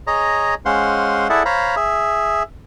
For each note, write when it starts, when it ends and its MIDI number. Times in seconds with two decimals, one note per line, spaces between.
0.07 0.54 68
0.07 0.54 73
0.07 0.54 75
0.07 0.54 82
0.65 1.28 56
0.65 1.28 61
0.65 1.28 72
0.65 1.28 77
0.65 1.28 78
0.65 1.28 84
1.30 1.43 64
1.30 1.43 68
1.30 1.43 69
1.30 1.43 74
1.30 1.43 76
1.30 1.43 78
1.45 1.75 72
1.45 1.75 73
1.45 1.75 77
1.45 1.75 82
1.45 1.75 83
1.76 2.43 68
1.76 2.43 76